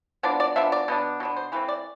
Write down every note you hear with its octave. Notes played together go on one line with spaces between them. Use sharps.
F3 B3 D4 D5
D5
F3 B3 D4 E5
D5
B2 B3 D4
B2 B3 D4
C5
E3 A3 C4 B4
D5